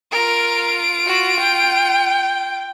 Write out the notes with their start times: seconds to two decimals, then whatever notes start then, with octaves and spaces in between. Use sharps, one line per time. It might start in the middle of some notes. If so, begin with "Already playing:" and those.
0.12 F4 A#4 D7
1.06 F#4
1.39 G5